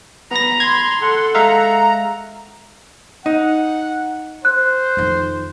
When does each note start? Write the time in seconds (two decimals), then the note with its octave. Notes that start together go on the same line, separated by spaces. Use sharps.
0.31 B3 A#5 B5 A#6
0.60 C6 G#6
1.00 A4 F#5
1.35 G#3 E5 F5 A#5
3.26 D#4 F#5
4.45 C5 F#6
4.97 F2 D#3